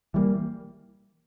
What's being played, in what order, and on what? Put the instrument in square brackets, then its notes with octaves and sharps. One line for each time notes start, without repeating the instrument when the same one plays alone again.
[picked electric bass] E3 G3 A#3